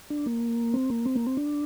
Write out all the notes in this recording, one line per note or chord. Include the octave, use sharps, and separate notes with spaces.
D4
A#3
C4
A#3
C4
A#3
C4
D4